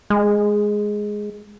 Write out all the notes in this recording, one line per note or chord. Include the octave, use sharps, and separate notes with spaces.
G#3